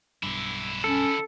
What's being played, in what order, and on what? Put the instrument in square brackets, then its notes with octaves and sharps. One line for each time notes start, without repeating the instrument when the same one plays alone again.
[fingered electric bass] B1 G2 [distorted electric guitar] D3 E4
[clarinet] C#4 [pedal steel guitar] A4